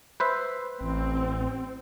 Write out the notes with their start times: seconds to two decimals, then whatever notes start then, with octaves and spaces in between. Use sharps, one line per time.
0.20 B4 C5 E5
0.81 A1 C4